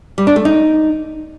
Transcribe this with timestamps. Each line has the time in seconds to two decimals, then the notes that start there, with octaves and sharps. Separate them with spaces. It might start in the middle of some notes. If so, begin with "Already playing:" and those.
0.18 G3
0.27 D4
0.36 A3
0.45 D#4